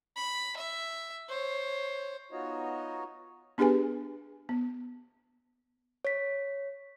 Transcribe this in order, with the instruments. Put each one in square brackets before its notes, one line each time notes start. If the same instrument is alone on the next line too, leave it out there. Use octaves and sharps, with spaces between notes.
[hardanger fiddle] B5
E5
C5 C#5
[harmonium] B3 D#4 F4 F#4 C#5 D#5
[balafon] B3 D4 G4 G#4 B4 G#5
B3
[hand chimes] C#5 B6